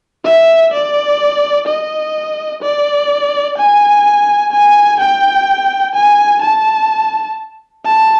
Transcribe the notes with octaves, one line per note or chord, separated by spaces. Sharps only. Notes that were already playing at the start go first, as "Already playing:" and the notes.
E5
D5
D#5
D5
G#5
G#5
G5
G#5
A5
A5